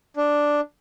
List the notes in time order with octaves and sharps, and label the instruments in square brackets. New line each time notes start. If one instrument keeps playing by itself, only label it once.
[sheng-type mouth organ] D4